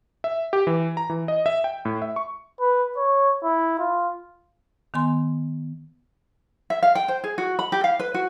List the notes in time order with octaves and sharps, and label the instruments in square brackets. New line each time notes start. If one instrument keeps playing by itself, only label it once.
[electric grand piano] E5
G4
E3
A#5
E3
D#5
E5
G5
A2
E5
C#6
[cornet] B4
C#5
E4
F4
[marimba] D#3 B3 G#5 C6
[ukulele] E5
F5
G5
C5
G#4
F#4
B5
G4
F5
B4
F#4